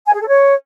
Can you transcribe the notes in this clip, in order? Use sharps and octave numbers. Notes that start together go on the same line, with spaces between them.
G#5
G#4
A4
C#5